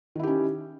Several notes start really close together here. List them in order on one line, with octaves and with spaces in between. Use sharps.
D#3 E4 G4 C#4